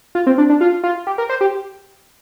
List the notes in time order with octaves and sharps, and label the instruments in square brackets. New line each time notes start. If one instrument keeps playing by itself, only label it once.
[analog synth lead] F4
C4
D4
D4
F4
F4
G4
A#4
C5
G4